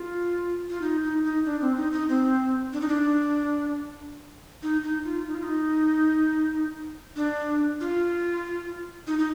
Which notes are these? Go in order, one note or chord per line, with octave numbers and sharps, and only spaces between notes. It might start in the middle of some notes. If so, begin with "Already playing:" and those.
Already playing: F4
F4
D#4
D#4
D#4
D4
C4
D#4
D#4
C4
D4
D#4
D4
D#4
D#4
F4
D#4
F4
D#4
D4
F4
D#4
D#4